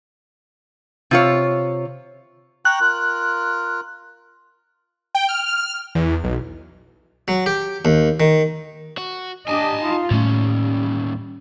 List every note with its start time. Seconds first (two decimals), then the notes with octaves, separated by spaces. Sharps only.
1.11 C3 F4 C#5
2.65 G5 A#5 C#6 F#6
2.81 F4 A#4
5.15 G5
5.29 F6
5.95 E2
6.24 B1
7.28 F#3
7.46 G4
7.85 D#2
8.20 D#3
8.98 F#4
9.48 D4 G4 D#5 G#5 A5
9.79 D#4 F4
10.11 D#2 A2 G3 A3 C#4